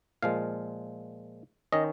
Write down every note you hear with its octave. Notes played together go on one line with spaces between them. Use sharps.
A#2 F3 G#3 F5
D#3 C#4 D#5